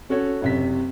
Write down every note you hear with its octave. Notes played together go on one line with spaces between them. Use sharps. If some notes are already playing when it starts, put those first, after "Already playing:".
C#4 F#4 A4 C#5
F#1 C3 B6